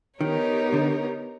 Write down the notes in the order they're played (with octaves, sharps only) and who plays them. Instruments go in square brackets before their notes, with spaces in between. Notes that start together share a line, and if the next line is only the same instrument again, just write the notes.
[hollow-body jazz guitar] D#3 [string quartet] B3 D#4 G4 A#4 C#5
[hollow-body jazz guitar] D3